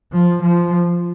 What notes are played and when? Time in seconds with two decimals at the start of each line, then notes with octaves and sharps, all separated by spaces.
0.12 F3
0.42 F3